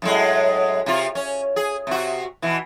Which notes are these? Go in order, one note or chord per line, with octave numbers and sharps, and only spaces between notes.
F#2 A2 G#3
C3 F4
C#4
G#4
C3 F#4
B2 E3